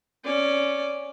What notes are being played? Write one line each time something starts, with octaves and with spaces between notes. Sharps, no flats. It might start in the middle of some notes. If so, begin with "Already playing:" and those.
C#4 D5